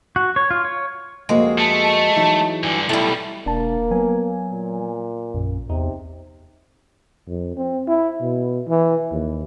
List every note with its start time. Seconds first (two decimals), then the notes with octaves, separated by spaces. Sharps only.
0.16 F#4
0.36 C#5
0.51 F4
0.65 C#5
1.29 F2 G#3 A#3 F#4
1.59 A3 A5
1.83 A5
2.17 E3 F#3 D#4
2.63 G2 D3 G#5
2.89 B1 G3 A3 E4
3.46 E1 A#3 D4 A5
3.91 F#3 B3 G#5
4.51 A#2
5.34 A#1 F#2
5.70 E2 C3 D#4
7.28 F2
7.57 C4
7.88 E4
8.21 B2
8.68 E3
9.11 D#2